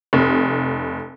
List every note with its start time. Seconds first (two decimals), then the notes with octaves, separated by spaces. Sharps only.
0.13 F1